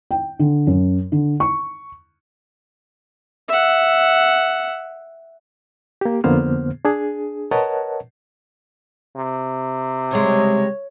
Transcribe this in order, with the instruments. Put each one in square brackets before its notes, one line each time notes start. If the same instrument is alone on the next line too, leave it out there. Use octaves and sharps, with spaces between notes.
[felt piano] G5
D3
F#2
D3
C#6
[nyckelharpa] E5 F#5
[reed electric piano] A#3 G4
F2 D3 A#3 B3 C5 F6
D4 G#4
A#4 B4 C#5 D#5 F#5 A5
[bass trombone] C3
[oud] C#3 G3 G#3 [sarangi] C#5